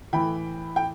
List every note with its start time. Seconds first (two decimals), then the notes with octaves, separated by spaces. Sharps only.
0.13 A2 E3 G5 B5
0.76 G5